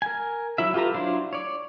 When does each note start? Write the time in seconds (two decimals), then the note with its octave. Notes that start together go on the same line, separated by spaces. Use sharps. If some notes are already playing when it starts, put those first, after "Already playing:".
0.02 A#4 G#5
0.58 F#3 E4 E5
0.74 F4 G4 A4 B4 A#5
0.94 F#3 D4 E4 F4 C5
1.33 C#5 D5